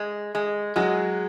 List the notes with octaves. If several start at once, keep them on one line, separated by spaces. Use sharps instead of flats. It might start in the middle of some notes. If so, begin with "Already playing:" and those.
Already playing: G#3
G#3
F#3 G#3 F#4